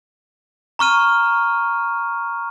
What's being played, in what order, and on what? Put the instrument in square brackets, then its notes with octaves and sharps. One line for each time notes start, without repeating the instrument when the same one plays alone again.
[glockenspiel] A#5 C#6 F6 D#7